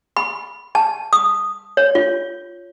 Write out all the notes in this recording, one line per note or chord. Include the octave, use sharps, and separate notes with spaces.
B5
A5
D#6
C#5
F4